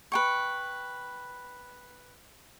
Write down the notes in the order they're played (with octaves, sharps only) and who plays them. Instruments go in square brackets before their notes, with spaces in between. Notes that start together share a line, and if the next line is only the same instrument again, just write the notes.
[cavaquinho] B4 G5 C#6